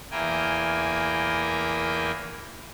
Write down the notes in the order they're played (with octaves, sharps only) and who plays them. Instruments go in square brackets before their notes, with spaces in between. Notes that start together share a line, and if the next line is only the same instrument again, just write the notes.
[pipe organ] E2 A#3 E4 A#4 G5 G#5